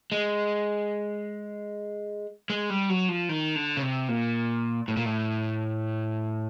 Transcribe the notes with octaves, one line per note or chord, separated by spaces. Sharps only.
G#3
G#3
G3
F#3
F3
D#3
D3
C#3
C3
A#2
A2
A#2
A2